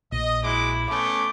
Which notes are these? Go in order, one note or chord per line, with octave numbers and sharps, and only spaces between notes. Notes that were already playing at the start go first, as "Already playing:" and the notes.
A#1 D#5
G#3 E4 F#4 D6
A3 B3 C#4 D6 G6